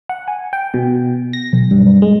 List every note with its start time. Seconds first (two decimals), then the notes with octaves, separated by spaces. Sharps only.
0.09 F#5
0.28 G#5
0.53 G5
0.74 B2
1.33 A#6
1.53 B1
1.71 G2
2.02 G#3